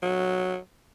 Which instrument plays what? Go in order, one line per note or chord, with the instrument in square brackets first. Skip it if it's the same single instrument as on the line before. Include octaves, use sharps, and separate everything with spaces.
[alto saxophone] F#3